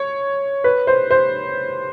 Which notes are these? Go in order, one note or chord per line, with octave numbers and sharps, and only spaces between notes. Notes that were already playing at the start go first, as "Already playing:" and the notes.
Already playing: C#5
B4
C5
C5